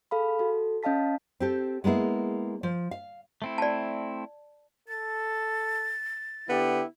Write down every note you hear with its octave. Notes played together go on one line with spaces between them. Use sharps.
G#4 A4 F5 B5
F#4 A4
C#4 D#5 F5 A5 B6
C4 G4 A4
G#3 A#3 B3 E4 G#4
F3
F5
A3 C4 E4
D5 A5
A4 A6
D3 B3 E4 G4